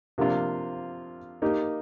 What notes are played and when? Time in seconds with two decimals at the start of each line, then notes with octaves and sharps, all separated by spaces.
0.18 C3 F3 A#3 D4 F4
1.42 A#3 D#4 G4